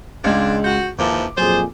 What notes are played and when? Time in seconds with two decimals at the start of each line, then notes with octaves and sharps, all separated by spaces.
0.24 C#2 G#3 D4 F5 G#6
0.64 F#4 G6
0.99 D#2 G#2 E3 F3 A#3 A5 D6
1.38 F2 A#2 F#3 F4 G#4 C5